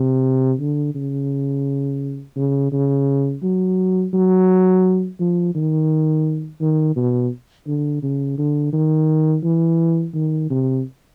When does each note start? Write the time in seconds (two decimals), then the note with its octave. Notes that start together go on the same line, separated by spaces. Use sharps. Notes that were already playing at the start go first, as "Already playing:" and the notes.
Already playing: C3
0.60 D3
0.95 C#3
2.36 C#3
2.72 C#3
3.43 F#3
4.14 F#3
5.20 F3
5.55 D#3
6.61 D#3
6.96 B2
7.67 D3
8.03 C#3
8.38 D3
8.73 D#3
9.44 E3
10.15 D#3
10.50 C3